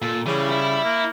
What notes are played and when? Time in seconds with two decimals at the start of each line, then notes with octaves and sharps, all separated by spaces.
0.02 A#2 A4
0.26 C#3 E3 G3
0.50 E4
0.84 A#3